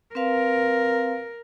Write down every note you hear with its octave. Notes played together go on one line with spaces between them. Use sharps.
C4 A#4 B4 F5